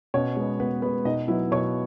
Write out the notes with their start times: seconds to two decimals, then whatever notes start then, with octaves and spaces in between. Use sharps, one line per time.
0.14 B2 C#4 C#5
0.37 G#3 B3
0.60 B2 B3 B4
0.82 G#3 B3 B4
1.05 B2 D#4 D#5
1.28 F#3 B3 E4 E5
1.51 B2 C#5 C#6